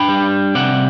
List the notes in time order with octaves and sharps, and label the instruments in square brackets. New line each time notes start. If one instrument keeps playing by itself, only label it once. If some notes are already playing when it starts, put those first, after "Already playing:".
Already playing: [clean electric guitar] D4 G5 B5
G3
C3 D5 F#5